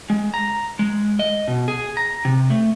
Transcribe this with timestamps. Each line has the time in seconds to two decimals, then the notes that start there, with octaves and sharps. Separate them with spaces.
0.10 G#3
0.34 A#5
0.79 G#3
1.19 D#5
1.48 B2
1.68 G#4
1.97 A#5
2.25 C3
2.50 A3